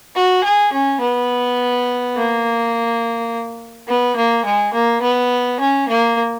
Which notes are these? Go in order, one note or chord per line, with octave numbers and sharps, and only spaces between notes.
F#4
G#4
C#4
B3
A#3
B3
A#3
G#3
A#3
B3
C#4
A#3